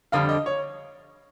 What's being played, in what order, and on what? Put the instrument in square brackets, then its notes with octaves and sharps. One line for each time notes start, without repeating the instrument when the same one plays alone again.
[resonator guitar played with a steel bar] F2 D3 G3 [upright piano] F5
[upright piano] D#5
C#5